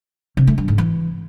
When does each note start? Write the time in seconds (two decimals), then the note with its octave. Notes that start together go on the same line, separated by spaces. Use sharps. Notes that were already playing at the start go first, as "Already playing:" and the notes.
0.37 C3
0.47 A3
0.58 G2
0.68 G#2
0.78 E3